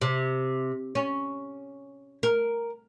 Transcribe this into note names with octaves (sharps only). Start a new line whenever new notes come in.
C3
C#4
A#4